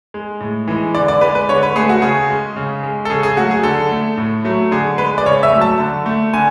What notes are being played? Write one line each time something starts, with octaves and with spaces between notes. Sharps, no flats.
G#3
A2
E3 G#3
D3 D5
D5
G#3 B4
B4
D3 C#5
B4
A3 G#4
F#4
C#3 G#4
G#3
C#3
G#3
A4
C#3 G#4
G#4
F#3 A3 F#4
G#4
D3 A4
A3
A2
F#3 A3
D3 G#4
G#3 B4
D5
C#3 C#5
E5
F#3 A3
A5
D3
A3
D3 G#5